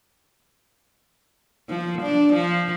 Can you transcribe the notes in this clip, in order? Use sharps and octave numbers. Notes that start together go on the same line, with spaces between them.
F3
D4
F3